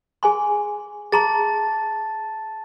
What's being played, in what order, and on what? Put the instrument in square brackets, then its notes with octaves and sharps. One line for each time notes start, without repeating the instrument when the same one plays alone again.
[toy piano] G#4 G#5 C6
[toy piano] G#4 A#5 C6 [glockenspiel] A5 A6